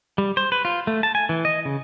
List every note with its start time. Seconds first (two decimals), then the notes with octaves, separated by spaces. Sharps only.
0.18 G3
0.37 C5
0.52 B4
0.65 F4
0.87 A3
1.03 A5
1.15 G#5
1.29 E3
1.45 D#5
1.65 C#3